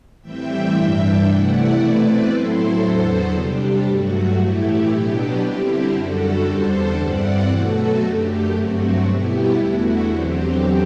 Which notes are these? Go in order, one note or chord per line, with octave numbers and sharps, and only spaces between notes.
A2 E3 G3 C4 E5 G5
G2 E3 G3 D4 E5 G5
C3 E3 A3 E4 D5 F#5
B2 A3 C4 E4 B4 D5
A2 F#3 C4 E4 A4 C5
E2 D3 F#3 B3 A4 C5
C3 G3 D4 G4
G2 F#3 A3 F#4
A2 E3 A3 E4 G4
B2 F#3 B3 D4 G4
D3 G3 C4 E4
F#2 D3 G3 F#4 A4
E2 D3 G3 D4 A4 C5
G2 E3 G3 C4 D5 F#5
B2 F#3 A3 F#4 A4
F#2 D3 A3 G4
G2 F#3 A3 C4 F#4
B2 G3 B3 E4 G4
E2 D3 A3 E4 F#4
E2 D3 F#3 C4 G4